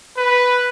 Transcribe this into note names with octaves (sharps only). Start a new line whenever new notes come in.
B4